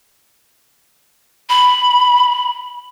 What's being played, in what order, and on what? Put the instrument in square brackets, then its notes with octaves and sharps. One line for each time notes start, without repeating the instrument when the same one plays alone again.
[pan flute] B5